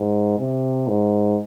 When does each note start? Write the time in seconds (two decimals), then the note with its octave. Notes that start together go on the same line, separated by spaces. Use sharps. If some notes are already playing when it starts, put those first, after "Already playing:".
Already playing: G#2
0.39 C3
0.87 G#2